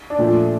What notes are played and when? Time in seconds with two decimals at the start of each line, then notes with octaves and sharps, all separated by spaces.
0.10 D4
0.18 A#2 F3 A3